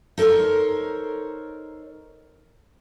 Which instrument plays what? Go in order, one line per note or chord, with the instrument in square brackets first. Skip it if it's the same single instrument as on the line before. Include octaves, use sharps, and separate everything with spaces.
[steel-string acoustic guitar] D#4 A4 A#4 C5 C#5